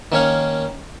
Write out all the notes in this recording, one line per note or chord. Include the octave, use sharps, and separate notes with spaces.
D#3 A#3 C#4 C#5 F5